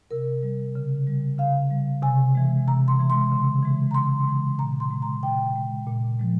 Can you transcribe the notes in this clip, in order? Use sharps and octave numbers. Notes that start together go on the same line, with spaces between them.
C3 A#4
G3
C#3
G3
C#3 F5
G3
C3 G#5
E3 G#3
C3 A#5
C6
E3 G#3
C6
C#3
E3 G#3
A#5
C#3 C6
E3 G#3
A#2 A#5
C6
G#3
A#5
A#2 G5
G#3
A#2
F3 G#3